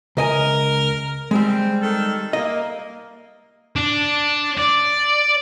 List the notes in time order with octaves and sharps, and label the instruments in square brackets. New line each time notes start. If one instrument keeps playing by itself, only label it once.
[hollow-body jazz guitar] C#2 D#5 G#5 [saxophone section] A#4
[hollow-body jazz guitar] G3 G#3 [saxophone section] C4
[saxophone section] D#3 A4
[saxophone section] A#3 [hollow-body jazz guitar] D#5
[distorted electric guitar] D4
D5